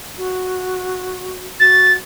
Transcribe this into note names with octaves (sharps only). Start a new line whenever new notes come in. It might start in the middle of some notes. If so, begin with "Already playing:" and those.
F#4
F#4 A6